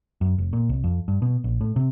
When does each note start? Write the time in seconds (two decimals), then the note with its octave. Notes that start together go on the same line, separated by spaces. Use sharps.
0.21 F#2
0.38 F1
0.53 A#2
0.69 C2
0.84 F2
1.08 G2
1.22 B2
1.44 A#1
1.61 A2
1.76 C3